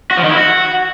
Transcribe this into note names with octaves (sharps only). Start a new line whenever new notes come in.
F#4
F3
D#3
E4
F#4